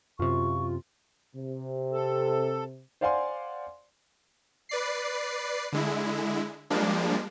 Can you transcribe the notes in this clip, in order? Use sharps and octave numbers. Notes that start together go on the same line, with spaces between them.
F#2 C3 F4 C#6
C3
A4
C5 D5 F5 F#5 G#5 C6
B4 D5 C7
D3 G#3 E4
F3 G3 G#3 A#3 D4